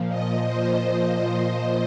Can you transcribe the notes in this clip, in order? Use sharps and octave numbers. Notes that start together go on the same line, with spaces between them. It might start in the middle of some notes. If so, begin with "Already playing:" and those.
Already playing: A#2 F3
D#5
C5
D#5